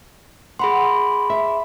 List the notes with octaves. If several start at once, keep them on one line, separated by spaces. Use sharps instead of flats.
G#4 F#5 B5 C6
E5